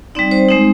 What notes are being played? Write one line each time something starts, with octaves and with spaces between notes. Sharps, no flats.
G3 C4 D#4 D5
C5
G#3 C4 D#4